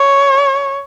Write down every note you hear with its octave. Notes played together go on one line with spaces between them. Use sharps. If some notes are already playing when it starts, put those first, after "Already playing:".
Already playing: C#5